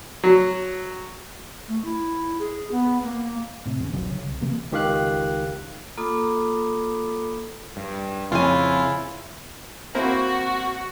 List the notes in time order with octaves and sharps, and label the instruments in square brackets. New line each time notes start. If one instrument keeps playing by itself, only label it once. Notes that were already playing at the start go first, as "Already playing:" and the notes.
[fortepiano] F#3
[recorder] A3
E4
G#4
B3
A#3
[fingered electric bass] A2 C3
E2 C#3
D#1 B1 G2 F#3
C#3
C2
C3 E3 A#3
[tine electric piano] C#2 D#3 G4 F5 F#6
[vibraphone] A#3 F4 A4 B5 D6 D#6
[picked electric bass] G2
[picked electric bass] F2 [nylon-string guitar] C#3 G#5 [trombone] E4 [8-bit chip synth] F4
[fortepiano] A#3 C4 E4 [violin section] F#4